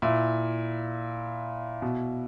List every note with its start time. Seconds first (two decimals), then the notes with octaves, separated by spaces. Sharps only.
0.02 A#2 E4
1.82 B2